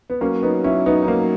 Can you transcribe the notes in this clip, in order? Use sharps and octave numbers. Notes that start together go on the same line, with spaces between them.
B3
F#3 A#3 C#4
B3 D#4
C#4 E4
B3 D#4
D#4
A#3 C#4